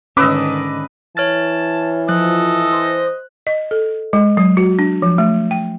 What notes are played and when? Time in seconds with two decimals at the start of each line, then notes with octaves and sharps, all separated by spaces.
0.17 G#2 D3 D#3 C#4 B4 D#5 D6 E6
1.17 E3 C#5 A5 F6 A6
2.09 F3 A4 D#5 F#6
2.72 C5
3.47 D#5
3.71 A4
4.13 G#3
4.37 F#3
4.57 F#4
4.79 D4
5.02 F3
5.18 A3
5.51 G5